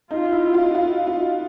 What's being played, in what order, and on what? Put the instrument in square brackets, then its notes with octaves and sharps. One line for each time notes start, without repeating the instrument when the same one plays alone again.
[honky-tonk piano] D#4 [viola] F4
[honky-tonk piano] E4
F4
F#4
F4
F4